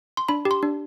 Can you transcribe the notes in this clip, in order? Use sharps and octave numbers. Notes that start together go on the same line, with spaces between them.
C6
D4 B5
G4
C6
D4